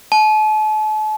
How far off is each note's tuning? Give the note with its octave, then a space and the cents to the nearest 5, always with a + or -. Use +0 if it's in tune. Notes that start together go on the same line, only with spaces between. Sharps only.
A5 -40